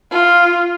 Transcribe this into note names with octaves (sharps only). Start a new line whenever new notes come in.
F4